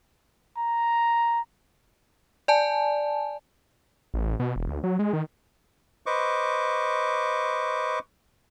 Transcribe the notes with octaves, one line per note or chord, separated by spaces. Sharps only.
A#5
D5 G#5 A5
A1
B2
E1
D2
F#3
G#3
D#3
B4 C5 D#5 C#6 D6